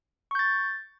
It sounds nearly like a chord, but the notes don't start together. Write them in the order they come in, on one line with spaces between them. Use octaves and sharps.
C#6 G6 A6